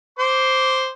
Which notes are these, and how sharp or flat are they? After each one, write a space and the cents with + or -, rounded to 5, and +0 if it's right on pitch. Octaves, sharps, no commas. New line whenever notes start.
C5 +0 D6 -10